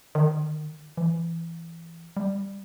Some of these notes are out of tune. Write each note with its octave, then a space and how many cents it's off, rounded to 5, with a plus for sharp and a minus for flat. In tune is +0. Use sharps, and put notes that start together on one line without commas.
D#3 -30
E3 +15
G3 +10